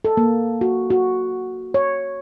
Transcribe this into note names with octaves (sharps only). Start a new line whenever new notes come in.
A4
A#3
F#4
F#4
C#5